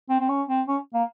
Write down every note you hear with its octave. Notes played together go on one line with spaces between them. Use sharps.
C4
C4
C#4
C4
C#4
A#3